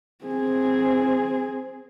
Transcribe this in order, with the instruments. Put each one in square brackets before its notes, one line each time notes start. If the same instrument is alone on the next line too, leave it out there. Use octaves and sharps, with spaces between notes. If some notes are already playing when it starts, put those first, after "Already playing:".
[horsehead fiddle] C4 G#4